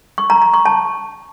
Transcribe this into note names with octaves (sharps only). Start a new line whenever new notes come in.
C#6
A#5
A#5
C#6
A5